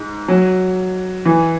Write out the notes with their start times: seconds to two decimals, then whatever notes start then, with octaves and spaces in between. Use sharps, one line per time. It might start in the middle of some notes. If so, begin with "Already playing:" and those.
Already playing: G#2
0.28 F#3
1.25 E3